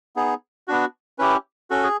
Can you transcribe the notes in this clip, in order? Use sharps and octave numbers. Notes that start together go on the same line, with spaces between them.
B3 D#4 G#4
B3 D4 F#4
C#4 E4 G4 B4
C#4 F#4 A4
G#4